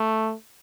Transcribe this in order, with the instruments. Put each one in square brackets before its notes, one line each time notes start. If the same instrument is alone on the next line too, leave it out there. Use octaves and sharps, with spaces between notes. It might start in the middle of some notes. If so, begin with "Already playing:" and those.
Already playing: [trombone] A3